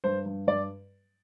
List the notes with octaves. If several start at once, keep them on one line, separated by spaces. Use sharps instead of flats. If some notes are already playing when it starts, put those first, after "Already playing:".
G2 C5
G2
G2 D5